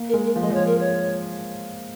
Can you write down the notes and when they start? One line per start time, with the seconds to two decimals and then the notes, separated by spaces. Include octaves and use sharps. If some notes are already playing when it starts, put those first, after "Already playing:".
Already playing: A#3
0.08 A#4
0.14 G#3
0.24 A#4
0.36 F3
0.41 G#3 D#5
0.50 F3 C#5
0.66 A#4
0.78 C#5